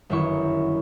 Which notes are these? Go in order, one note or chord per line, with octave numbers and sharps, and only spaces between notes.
G1 F#2 D#3 E4 C#6